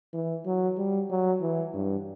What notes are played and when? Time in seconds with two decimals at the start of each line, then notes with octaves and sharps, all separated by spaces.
0.14 E3
0.46 F#3
0.78 G3
1.10 F#3
1.41 E3
1.74 G2